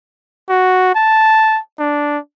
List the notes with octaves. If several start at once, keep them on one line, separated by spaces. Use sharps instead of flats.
F#4
A5
D4